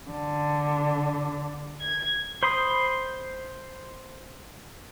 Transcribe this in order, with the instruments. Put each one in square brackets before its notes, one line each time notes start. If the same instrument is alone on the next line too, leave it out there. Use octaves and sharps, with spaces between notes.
[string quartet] D3
G#6
[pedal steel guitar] C5 B5 C6 D#6